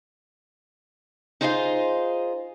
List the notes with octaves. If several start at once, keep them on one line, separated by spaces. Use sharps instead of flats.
D#4 F4 G#4 C5 D#5 F5